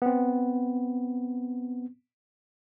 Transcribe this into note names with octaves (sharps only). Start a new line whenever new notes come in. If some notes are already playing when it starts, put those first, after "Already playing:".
B3 C4